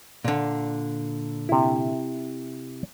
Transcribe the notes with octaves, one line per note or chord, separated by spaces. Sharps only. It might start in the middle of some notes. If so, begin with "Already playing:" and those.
A#2 D3
C3 E4